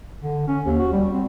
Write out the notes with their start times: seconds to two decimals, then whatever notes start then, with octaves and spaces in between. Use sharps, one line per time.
0.23 D3
0.48 C#4
0.65 D#2
0.80 F#4
0.93 G3
1.13 C4